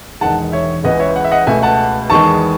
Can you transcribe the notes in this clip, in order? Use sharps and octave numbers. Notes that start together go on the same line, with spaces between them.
E1 E2 D#3 G#3 F#5 A5
C#5 E5
C#2 C#3 E3 G#3 B3 D#5 F#5
C#5 E5
F#5
E5
D#5 F#5
C#2 B2 A3 E5 G#5
F#5 A5
E2 D#3 G#3 B3 A5 C#6